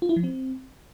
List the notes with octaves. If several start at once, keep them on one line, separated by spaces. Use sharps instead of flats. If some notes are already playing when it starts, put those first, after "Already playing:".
F4
E4
F3
C4